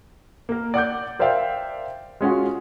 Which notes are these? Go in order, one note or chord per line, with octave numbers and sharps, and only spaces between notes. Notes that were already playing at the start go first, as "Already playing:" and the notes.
A#3 A#4
D5 F#5 D6 G6
A#4 C5 D5 E5 F5 G5
G#3 C#4 F4 F#4